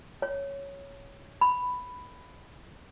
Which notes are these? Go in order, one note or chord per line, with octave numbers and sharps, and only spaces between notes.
C#5
B5